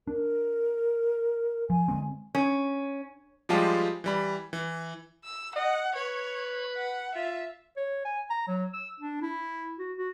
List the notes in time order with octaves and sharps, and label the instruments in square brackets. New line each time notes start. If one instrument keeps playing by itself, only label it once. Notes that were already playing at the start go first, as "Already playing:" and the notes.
[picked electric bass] D4 [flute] A#4
[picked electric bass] F3 [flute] G#5
[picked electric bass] D3 G#3 C4
[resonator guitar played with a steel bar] C#4
[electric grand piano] F3 G3 G#3 F4 G4 A5
E3 G3 B5
E3
[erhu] E6
[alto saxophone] D#5 [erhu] F#5
[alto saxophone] B4 [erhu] C#5
[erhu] F#5
[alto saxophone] F4 [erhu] E5
[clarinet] C#5
G#5
A#5
F#3
E6
D4
E4
F#4
F#4